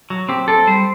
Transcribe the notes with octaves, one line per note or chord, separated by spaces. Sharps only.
F#3
C4 G4
C4 A4
G3 C5